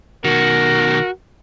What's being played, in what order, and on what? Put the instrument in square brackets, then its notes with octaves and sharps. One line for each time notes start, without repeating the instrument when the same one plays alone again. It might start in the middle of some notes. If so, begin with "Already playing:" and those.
[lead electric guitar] B2 D#3 [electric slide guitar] F#4 [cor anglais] A#4